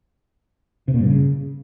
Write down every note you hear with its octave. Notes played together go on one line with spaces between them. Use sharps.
C3
A#2
G2
C#3